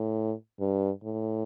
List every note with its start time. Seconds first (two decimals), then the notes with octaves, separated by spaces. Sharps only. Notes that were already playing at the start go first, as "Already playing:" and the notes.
Already playing: A2
0.60 G2
1.03 A2